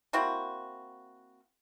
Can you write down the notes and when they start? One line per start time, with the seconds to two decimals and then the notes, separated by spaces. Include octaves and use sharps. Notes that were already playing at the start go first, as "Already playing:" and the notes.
0.13 A#3 C4 E4 F#4